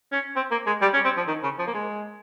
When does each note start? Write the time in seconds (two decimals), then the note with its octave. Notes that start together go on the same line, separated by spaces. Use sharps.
0.12 C#4
0.36 C4
0.51 A#3
0.67 G#3
0.82 G3
0.94 C#4
1.05 C4
1.17 F3
1.27 D#3
1.43 C#3
1.59 F3
1.67 A#3
1.74 G#3